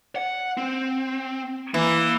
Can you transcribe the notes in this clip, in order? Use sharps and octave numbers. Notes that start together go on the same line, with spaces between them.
F#5
C4
E3 A#3